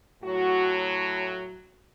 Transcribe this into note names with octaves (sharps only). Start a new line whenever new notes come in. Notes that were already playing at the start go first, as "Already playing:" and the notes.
A2 F#3 F#4